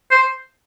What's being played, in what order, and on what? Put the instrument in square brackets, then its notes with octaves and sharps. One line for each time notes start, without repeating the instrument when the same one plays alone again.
[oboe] C5